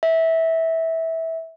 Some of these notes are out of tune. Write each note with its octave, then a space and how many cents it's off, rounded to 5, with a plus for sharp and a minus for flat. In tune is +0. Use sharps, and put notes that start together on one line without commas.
E5 -15